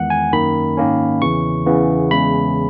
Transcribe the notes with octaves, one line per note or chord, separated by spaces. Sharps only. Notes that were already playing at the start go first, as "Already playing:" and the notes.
Already playing: E2 D#3 G#3 F#5
G#5
F#2 D#3 A#3 C#4 B5
G#2 D#3 A#3 C#4
E2 C#3 E3 C#6
E2 C#3 E3 B3
E2 C#3 G#3 B5